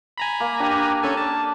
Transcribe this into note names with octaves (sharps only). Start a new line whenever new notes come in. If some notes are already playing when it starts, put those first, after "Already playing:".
G#5 A#5 B5
A#3
D4 G4
C#4 A4 G#5
A5